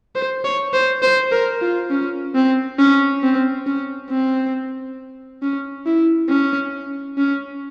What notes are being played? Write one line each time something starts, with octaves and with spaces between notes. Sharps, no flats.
C5
C#5
C5
C5
A#4
F4
C#4
C4
C#4
C4
C#4
C4
C#4
E4
C#4
C#4